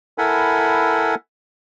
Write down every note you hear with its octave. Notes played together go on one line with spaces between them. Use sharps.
E4 A4 A#4 F#5 G#5 B5